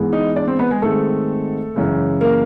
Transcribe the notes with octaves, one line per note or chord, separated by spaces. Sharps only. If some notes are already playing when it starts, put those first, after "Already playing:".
Already playing: G#2 E3 G#3 B3
D#4 D#5
D4 D5
C4 C5
B3 B4
G#3 G#4
G#2 D#3 G#3 A3 C4 A4
F#2 C#3 E3 G#3
A#3 A#4